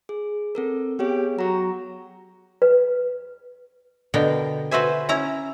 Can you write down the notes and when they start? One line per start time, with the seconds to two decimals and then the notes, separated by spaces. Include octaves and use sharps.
0.09 G#4
0.55 C4 A4 A#4
0.99 B3 G4 G#4 C#5
1.39 F#3 A#5 C#6
2.62 B4
4.14 B2 D3 B3 A#4 F5 G5
4.71 F#4 B4 C5 E5 G#5
5.09 C#4 E4 A#5